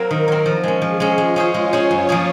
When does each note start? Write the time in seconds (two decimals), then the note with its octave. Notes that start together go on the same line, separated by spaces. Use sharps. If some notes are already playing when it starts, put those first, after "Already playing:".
Already playing: F#3 A#3 C4 A#4
0.11 D#3
0.28 F#3 C4
0.46 F3
0.63 G#3 C#4
0.82 F3 G#4
1.00 G#3 C#4
1.18 G#3 F4
1.36 C#4 G#4 C5
1.54 G#3 C#5
1.73 C#4 G#4 C5
1.91 F#2
2.09 F3 A#3 C#4 G#4